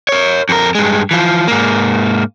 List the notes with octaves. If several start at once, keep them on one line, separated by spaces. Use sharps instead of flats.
A#4 C#5
F2 A#4
G2 G#3
E3 F3
G#2 A#3